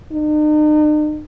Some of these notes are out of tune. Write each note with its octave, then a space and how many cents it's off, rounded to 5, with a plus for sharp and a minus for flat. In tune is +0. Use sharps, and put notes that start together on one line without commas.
D#4 -45